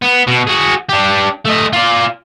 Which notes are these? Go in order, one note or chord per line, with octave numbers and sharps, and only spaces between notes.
B3
B2
F#4 G#4
D4 G4
A3 D#5
F4 D5